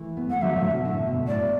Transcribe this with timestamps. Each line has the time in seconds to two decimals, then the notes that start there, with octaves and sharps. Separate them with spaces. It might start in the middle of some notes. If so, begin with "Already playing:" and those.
Already playing: E3 A3
0.17 B3
0.29 A3 F#5
0.42 D3 F#3 E5
0.56 A2 D3
0.70 B2
0.85 A2 D3
1.06 B2
1.27 A2 D5